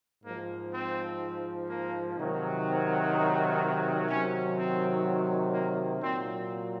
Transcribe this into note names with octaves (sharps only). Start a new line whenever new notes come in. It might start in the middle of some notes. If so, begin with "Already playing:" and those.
G#2 F3 A#3
C4
A#3
C3 D#3 F#3
C4
D#4
C3 D#3 F#3 C#4
C4
A#3
A#2 F#3 C4